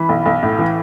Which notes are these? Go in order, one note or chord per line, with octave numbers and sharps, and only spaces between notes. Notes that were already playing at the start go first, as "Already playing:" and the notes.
Already playing: E3 B5
B1
B1
A2
E3